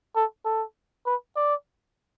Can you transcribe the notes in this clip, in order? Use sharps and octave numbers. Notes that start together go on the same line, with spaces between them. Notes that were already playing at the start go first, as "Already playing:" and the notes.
A4
A4
B4
D5